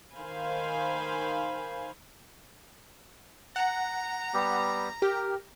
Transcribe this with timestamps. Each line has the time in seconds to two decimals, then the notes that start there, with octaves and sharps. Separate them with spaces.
0.15 D#3 C5 F5 G#5 B5
3.56 F#5 A#5
4.34 G3 B3 G4
5.02 G4 A#4